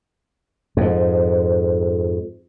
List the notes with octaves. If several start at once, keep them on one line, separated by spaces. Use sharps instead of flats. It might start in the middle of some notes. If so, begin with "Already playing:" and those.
F2 G#2